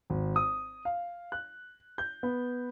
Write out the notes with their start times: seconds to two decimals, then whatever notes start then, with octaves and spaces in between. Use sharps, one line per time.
0.10 G#1
0.36 D#6
0.85 F5
1.32 F#6
1.98 G6
2.23 B3